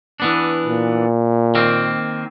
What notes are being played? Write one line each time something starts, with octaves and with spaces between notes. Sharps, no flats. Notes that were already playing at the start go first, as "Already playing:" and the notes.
E3 B3 D4
A#2
D#3 A#3 C4